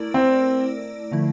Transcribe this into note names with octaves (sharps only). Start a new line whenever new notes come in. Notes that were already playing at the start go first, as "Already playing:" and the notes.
Already playing: A3 E4 A#4 D5
C4
D3 F3 A3 E4